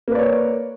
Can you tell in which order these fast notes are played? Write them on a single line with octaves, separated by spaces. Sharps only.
A#3 B4 D5 C#5